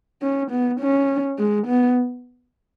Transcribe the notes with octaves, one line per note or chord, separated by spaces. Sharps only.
C#4
B3
C#4
G#3
B3